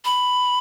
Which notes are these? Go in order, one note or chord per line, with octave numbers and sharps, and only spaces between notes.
B5